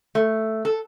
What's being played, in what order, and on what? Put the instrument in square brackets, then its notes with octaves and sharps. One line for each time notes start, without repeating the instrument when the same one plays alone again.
[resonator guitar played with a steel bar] A3
A4